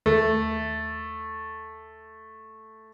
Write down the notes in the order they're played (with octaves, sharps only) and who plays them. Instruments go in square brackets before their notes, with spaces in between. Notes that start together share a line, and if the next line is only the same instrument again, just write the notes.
[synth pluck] D#2 [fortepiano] A3